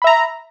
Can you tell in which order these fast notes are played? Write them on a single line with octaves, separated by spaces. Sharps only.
B5 E5 A#5